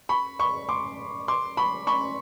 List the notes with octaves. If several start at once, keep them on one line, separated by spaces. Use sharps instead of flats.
B5 C#6
B5 C#6
C6 D6
C6 D6
B5 C#6
B5 C#6